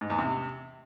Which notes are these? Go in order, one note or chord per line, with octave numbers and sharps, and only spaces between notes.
G#2
E2
C3